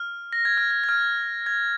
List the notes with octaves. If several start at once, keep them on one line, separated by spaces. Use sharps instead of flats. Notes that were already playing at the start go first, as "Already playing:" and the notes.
Already playing: F6
A#6
G#6
F6
G#6
G#6
F6
G#6